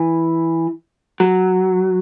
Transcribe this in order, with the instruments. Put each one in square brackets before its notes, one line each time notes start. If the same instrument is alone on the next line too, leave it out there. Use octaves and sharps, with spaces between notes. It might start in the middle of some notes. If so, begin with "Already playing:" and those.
Already playing: [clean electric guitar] E3
F#3